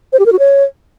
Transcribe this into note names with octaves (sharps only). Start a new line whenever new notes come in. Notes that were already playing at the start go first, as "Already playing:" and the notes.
C5
G4
A#4
F#4
C#5